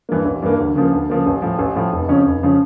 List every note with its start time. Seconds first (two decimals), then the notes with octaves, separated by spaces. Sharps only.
0.09 G2 E3 A#3
0.25 A1
0.42 G2 E3 A#3
0.59 D2
0.75 C#3 F3 A#3
0.93 D2
1.10 C#3 F3 A#3
1.26 A1
1.42 A2 F3
1.59 A1
1.75 A2 F3
1.92 F1
2.08 F2 C#3 F3 C#4
2.25 F1
2.43 C#3 F3 C#4